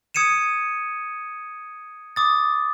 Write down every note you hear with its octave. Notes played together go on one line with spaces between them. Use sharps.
D#6 G#6 C#7 D#7 E7
D6 D#6 A6